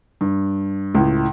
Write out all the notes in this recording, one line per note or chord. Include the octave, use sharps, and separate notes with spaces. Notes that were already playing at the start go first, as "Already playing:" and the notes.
G2
C#2 A2